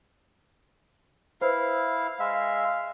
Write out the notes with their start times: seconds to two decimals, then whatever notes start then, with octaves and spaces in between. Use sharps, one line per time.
1.41 E4 B4 C5 F5
2.19 G#3 E5 F5